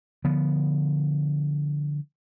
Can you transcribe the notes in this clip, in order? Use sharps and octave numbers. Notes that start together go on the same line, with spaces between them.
D3 F3 B3